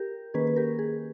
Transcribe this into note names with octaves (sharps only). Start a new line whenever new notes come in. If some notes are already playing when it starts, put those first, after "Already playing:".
Already playing: G4 A#4
D#3 A#3 C#4 G#4 B4
B4
G4 A#4
G#4